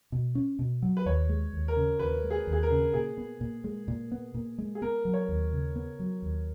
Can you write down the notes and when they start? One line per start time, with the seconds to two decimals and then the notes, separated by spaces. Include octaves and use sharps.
0.12 B2
0.35 C#4
0.59 B2
0.82 F#3
0.97 B4
1.06 D#2 C#5
1.29 G#3
1.53 D#2
1.68 A#4
1.77 C#3
1.99 D#2 B4
2.24 G#3
2.31 G#4
2.47 D#2
2.53 G#4
2.63 A#4
2.71 C#3
2.93 A#2 G#4
3.18 B3
3.41 A#2
3.64 G#3
3.88 A#2
4.12 B3
4.34 A#2
4.58 G#3
4.75 G#4
4.82 B3 A#4
5.05 F#3
5.14 C#5
5.28 D#2
5.53 C#3
5.76 B3
5.99 F#3
6.22 D#2